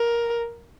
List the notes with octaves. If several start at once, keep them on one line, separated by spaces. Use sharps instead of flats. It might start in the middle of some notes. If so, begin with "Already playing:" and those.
Already playing: A#4